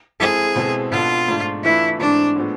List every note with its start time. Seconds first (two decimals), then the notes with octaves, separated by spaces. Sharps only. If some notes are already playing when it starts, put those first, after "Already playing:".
0.20 G#3 C4 E4 G#4 A4
0.56 B2 G#3 C4 E4 A4
0.92 B2 B3 D4 F4 A4
1.28 G#2 F3 A3 D4
1.63 E3 A3 D4 E4 F4 B4
1.99 G#2 E3 A3 C4 D4 E4
2.36 A2 F3 G#3 B3